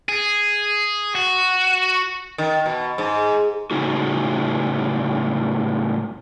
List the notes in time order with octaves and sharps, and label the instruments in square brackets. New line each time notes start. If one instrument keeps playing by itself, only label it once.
[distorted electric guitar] G#4
F#4
[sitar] D#3
B2
G#2
[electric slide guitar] A2 C#3 G#3 D#4 F#4